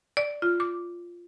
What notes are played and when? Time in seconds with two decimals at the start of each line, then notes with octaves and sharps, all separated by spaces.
0.17 D5
0.42 F4
0.60 D6